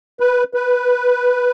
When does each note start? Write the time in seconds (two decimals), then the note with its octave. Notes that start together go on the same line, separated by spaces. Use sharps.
0.20 B4
0.54 B4